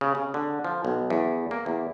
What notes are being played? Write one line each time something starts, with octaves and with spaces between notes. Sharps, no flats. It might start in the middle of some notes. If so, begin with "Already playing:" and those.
C#3
C#3
D3
F3
B1
E2
A#3
E2